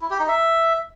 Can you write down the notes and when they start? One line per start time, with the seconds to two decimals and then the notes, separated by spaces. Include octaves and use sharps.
0.01 E4
0.10 G4
0.19 D#4
0.28 E5